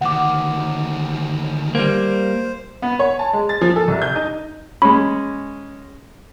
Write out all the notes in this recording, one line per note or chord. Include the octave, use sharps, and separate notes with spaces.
D2 D#3 F#5 D6
G3 A#3 C5
B3
C#5
A5
G#3
A6
F3
A4
C2
G6
D#4
G#3 C#4 B5